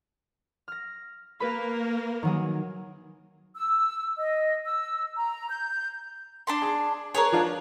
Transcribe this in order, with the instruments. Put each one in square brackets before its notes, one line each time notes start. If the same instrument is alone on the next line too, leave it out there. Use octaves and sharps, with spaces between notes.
[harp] F6 A#6
[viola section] A#3 A#4 [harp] B4 B5
[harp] D#3 F#3 G#4
[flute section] E6
D#5
E6
A#5
G6
[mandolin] D4 A5 C6
[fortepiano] G#4
[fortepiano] G#4 [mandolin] A#4 B4 C#5
[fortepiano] F3 D4 F4